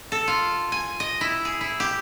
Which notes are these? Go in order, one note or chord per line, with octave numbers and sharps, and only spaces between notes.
A4
F4
G#5
D#5
E4
G#4
E4
G4